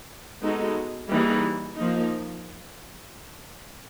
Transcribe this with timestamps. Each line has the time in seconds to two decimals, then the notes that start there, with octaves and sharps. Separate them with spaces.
0.41 G#3 B3 D#4 F#4 A4
1.08 E3 G3 A#3 D#4 G#4
1.76 F3 A#3 D#4